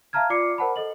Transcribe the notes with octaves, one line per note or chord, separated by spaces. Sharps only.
E5 F5 A5 A#5 F6 G#6
F4 D5 D6 C7 C#7
A#4 C5 F#5 A5 B5
A4 D#5 F#7